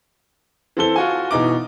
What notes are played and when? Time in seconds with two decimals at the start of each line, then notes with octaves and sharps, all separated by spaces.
0.77 E3 C4 A4 G7
0.96 F4 F#4 G#5
1.31 B2 E3 D#4 D6